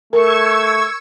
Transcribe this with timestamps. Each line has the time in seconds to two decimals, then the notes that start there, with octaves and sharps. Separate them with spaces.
0.13 A3 A#4 C#6 E6 G#6